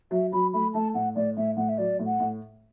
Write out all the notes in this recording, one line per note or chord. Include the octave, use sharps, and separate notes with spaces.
F#3 E5
F#3 B5
A3 B5
A3 A5
A2 F#5
A2 D5
A2 E5
A2 F#5
E5
F#3 D5
A2
F#5
A2